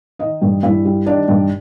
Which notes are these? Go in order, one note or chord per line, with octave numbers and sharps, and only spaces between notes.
D#3 D#4 D#5
G2
G2 E4 E5
G3
D#3 D4 D5
G2